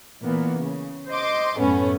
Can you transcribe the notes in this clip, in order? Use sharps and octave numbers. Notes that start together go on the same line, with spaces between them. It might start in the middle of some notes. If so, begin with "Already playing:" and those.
A#2 E3 A#3 B3
C#3
C5 D#5 C6 D6
F#2 A2 A3 B3 C#4